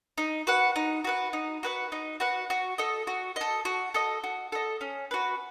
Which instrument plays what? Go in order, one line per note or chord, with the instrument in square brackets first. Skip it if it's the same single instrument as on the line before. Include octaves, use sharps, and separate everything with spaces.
[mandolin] D#4
F#4 B4 F#5
D#4
F#4 B4 F#5
D#4
F#4 B4 F#5
D#4
F#4 B4 F#5
F#4
A4 D#5
F#4
A4 D#5
F#4
A4 D#5
F#4
A4 D#5
C#4
F#4 B4